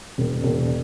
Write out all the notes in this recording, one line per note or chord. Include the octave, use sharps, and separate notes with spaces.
E1
E1